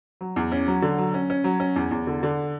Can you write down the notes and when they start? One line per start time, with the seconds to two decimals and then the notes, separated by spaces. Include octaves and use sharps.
0.21 F#3
0.36 E2
0.52 C#4
0.67 F#3
0.82 D3
0.98 F#3
1.14 C#4
1.30 C#4
1.44 F#3
1.60 C#4
1.76 E2
1.91 E2
2.07 D3
2.23 D3